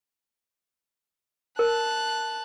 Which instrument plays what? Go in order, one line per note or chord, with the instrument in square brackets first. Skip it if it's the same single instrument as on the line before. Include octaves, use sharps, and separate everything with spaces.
[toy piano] A#4 [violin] A5 F#6